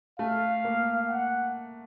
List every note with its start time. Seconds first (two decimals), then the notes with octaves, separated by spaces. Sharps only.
0.19 A3 F5
0.64 A#3
1.08 F#5